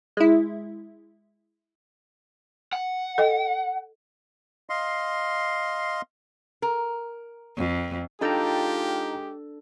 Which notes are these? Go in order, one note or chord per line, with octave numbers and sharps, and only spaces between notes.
G#3 E4
F#5
A4 D#5 G5
D#5 F5 C6
A#4
F2
G#3 D4 D#4 F4 G4 A4 G5 A#5